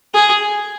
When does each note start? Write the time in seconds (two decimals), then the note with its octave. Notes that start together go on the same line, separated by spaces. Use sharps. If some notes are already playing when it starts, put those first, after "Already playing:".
0.14 G#4